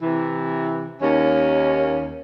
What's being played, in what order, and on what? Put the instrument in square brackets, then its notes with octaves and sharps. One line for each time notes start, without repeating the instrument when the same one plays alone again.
[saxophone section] C3 E3
D#2 C#4